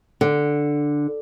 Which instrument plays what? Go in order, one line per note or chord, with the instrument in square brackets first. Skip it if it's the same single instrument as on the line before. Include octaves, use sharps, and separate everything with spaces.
[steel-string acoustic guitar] D3